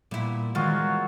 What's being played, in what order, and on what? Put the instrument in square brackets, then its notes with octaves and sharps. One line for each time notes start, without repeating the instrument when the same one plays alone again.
[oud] A#2 E4 [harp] G3 B3 G4
[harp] D#3 E3 C5 [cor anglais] F#3 [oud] G#3 C4 [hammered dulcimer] F4 F#4